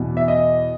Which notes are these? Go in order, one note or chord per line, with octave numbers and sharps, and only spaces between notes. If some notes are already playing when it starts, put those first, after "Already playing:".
Already playing: E2 B2
E5
D#5